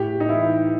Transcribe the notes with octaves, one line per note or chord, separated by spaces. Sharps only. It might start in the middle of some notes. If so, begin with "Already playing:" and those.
Already playing: A2 G4
D#4
E3 E4